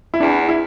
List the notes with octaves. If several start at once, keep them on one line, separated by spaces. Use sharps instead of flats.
E4
E2 D4
E4